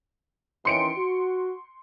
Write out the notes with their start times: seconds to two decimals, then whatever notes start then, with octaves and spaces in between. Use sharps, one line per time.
0.65 D#3 E3 C#4 C6 C#7 D7
0.97 F#4